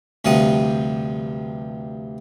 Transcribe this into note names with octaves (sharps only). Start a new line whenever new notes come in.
D2 G2 C3 F3 F#5 D#6